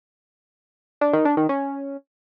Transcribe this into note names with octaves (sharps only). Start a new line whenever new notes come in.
D4
D#3
D4
D#3
C#4